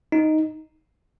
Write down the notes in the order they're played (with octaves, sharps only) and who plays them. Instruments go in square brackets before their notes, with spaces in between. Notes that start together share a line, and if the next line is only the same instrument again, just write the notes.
[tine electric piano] D#4